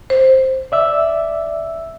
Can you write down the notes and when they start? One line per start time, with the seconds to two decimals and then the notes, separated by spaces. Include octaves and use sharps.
0.10 C5
0.72 D5 E5 E6